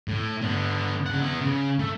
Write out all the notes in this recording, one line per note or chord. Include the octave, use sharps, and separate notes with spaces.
A2
D3 B3
C#3 F#5
B3 E4
C#3
A3